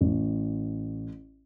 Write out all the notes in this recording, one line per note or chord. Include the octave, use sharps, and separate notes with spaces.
A1